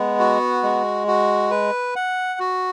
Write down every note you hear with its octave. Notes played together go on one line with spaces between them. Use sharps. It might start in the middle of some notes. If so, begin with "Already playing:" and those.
Already playing: G#3 B3
F#4
G#3
F#4
B4
F#5
F#4